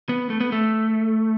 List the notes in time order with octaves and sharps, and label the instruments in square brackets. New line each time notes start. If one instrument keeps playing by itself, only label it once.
[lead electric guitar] B3
A3
B3
A3